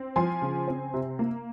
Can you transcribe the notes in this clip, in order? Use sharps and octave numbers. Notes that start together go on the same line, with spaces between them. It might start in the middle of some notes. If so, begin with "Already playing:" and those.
Already playing: C4
F3 G#5 C6
C#3
C4
C3
A#3